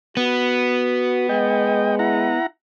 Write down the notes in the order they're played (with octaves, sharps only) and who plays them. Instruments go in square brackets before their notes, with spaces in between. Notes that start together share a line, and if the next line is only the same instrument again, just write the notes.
[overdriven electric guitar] B3 [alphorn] F#4
[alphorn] G#3 [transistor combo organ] D#5 G5
[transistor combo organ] E4 F#5 A#5